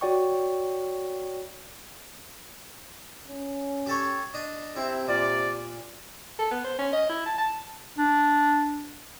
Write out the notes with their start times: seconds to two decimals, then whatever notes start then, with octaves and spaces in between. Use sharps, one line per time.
0.01 F#4 C#5 D5 G5 C#6
3.28 C#4
3.86 G4 A4 C#5
4.34 D4 D#5
4.76 C3 C4 E4
5.08 A#2 D5
6.39 A4
6.51 B3
6.65 C5
6.79 C#4
6.93 D#5
7.10 E4
7.26 A5
7.38 A5
7.98 D4